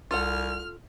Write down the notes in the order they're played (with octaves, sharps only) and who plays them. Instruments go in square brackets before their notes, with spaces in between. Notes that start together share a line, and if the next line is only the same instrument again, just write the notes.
[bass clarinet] C2 [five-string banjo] F4 A4 F#5 [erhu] F6